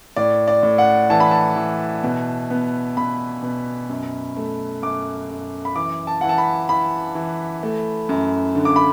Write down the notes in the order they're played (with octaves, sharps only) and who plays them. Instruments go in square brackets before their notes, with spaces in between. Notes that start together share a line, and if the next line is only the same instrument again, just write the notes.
[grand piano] A2 D5
D5
A2
F#5
E3 A5
B5
A5
E3
B2
B3
B2 B5
B2
F#2
A3
F#2 D6
F#2
B5
E3 D6
A5
E3 F#5
A5
B5
E3 B5
E3
A3
F#2
D3
D6
B5